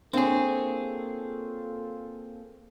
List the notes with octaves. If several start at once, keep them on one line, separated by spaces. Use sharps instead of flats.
A#3 C4 D4 F4 G#4 A4 C#5